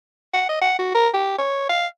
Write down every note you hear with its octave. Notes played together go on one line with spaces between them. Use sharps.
F#5
D#5
F#5
F#4
A#4
G4
C#5
F5